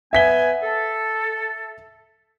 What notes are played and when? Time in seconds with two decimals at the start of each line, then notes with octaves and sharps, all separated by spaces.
0.13 B3 B4 E5 G#5 B6 G7
0.63 A4